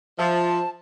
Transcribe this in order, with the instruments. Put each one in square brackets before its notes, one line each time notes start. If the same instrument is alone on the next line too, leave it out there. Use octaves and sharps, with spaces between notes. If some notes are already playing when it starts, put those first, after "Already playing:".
[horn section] F3 [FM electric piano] C5 E5 [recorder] A5